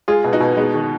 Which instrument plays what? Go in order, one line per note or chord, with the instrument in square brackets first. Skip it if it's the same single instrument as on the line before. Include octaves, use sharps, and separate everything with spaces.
[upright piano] G#3 [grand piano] F4 G#4
[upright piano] B2
[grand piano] D#4 F#4
[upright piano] B2
[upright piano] G#3 [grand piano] B3 D#4
[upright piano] D#3